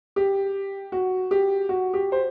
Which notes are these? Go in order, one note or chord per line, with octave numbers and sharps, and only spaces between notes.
G4
F#4
G4
F#4
G4
C5